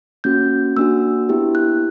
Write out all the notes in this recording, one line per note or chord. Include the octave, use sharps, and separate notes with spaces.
A#3 C#4 F#4 G6
A#3 D4 F#4 E6
B3 E4 G4
F#6